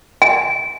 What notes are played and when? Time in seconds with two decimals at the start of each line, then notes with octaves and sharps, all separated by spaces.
0.22 G#5